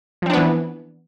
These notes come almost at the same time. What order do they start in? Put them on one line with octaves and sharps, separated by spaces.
F3 C4 D4 B3 E3